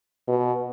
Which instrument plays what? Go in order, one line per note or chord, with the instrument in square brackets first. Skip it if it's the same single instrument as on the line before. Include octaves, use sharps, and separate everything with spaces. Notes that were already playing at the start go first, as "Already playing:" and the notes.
[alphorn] B2